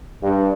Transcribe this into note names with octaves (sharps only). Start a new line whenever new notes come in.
G2